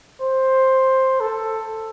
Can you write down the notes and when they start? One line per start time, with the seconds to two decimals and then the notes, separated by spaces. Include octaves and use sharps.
0.21 C5
1.20 A4